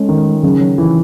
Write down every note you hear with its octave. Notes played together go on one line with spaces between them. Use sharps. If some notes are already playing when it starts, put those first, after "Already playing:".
Already playing: G#3 A3 C#4
D#3
C#3 F#3
F#3
E3